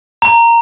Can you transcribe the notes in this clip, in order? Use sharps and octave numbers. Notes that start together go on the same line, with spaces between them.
A#5